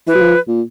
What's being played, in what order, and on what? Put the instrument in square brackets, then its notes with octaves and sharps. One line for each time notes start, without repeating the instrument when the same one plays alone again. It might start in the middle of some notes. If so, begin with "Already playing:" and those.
[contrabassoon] E3 [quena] B4
[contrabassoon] F#3
F3
A#2